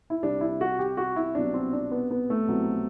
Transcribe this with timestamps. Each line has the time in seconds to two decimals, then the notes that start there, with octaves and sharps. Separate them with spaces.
0.10 E4
0.23 C2 C3 G3 D4
0.41 E4
0.61 F#4
0.79 G4
0.97 F#4
1.16 E4
1.35 C2 B2 F#3 D4
1.54 C4
1.73 D4
1.91 B3
2.11 B3
2.30 A3
2.48 C2 B2 F#3 C4 E4